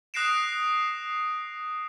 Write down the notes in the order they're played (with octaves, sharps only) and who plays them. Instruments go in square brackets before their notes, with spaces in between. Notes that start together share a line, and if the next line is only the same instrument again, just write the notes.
[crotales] D#6 F#6 A#6 C7 D7 E7